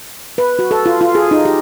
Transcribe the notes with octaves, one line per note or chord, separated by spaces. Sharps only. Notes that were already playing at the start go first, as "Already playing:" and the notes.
B4
F#4
A4
F4
F4
G#4
D#4
G4